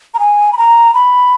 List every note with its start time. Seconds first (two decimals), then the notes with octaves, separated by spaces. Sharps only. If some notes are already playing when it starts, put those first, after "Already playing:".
0.14 A#5
0.19 G#5
0.53 B5
0.57 A#5
0.94 B5